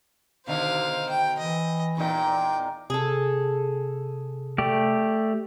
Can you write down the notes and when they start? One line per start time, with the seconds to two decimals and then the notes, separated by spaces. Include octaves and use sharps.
0.47 B2 D3 D#3 C5 F5
1.10 G5
1.39 E3 D#5
1.97 E2 A#2 D#4 G5
2.90 C3 G#4 A4
4.58 A3 G4 D5